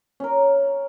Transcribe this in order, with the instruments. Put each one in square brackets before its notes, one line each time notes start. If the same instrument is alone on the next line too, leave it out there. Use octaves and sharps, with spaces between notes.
[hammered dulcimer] C#4 A#4